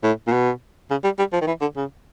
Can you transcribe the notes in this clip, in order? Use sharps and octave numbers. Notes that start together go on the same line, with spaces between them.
A2
A#2
B2
C#3
G3
G3
F3
D#3
E3
D3
C#3